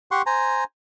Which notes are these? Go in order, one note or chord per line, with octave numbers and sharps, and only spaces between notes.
G4 F#5 C6 C#6
C5 G#5 A#5